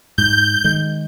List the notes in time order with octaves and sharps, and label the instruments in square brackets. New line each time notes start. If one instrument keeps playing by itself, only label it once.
[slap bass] G#2 [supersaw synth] G6
[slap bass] D#3 G#3